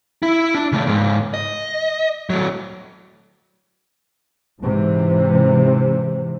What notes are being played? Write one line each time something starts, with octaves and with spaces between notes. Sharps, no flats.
E4
D4
C#3 A3
C#2 G#2
D#5
F#3 A3
G#2 C3 E3